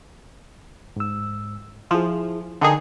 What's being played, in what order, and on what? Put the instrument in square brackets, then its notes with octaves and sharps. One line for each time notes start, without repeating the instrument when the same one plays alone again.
[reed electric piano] G#2 E6
[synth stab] F3 [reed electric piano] E4 G#4
[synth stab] D3 D#4 G#4 [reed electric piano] A#4 G5 A5